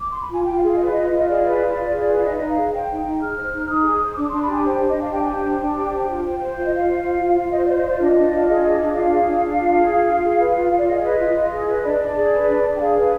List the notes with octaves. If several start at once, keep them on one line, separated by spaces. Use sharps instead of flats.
D6
C6
B5
F4 G#5
F4 G5
F5
G#4
F5
D#5
B4
D5
F4 D#5
F4
D#5
G#4 D5
B4
F4
F4
G#4
B4
F5
D#4 D#5
D#4 D#5
F5
G#4
C5 G5
D#4
D#4
G#4 F6
C5
D#4
D#4 D#6
G#4
C5
D4 D6
D4 C6
B5
G4 G#5
C5 G5
D4
D#5
D4 F5
G4 G5
C5 G#5
G5
D4
D4
G4
C5
F4
C5
C5
F4 F5
D#5
F4 F5
C5
C5
F4
F4
C5 D#5
C5 D5
D#5
F4 D5
D4 D#5
D4
F4
D5
G#4 D#5
D4
D4
F4 F5
G#4
D4
D4
F4
G#4
F4
F4
G#4
B4
F4
F4
D5
G#4 D#5
B4
F4
F4
G#4
B4
D4 D5
D4
G#4
B4
D4
D4
G5
G#4 F5
B4